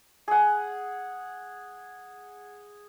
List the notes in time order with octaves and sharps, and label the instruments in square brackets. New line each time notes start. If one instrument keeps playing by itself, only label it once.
[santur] G#4 F#5